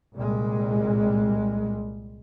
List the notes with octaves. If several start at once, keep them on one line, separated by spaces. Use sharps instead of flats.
C2 A#2 G3 G#3